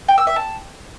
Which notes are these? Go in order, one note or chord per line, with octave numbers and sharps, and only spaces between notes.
G5
E6
E5
A5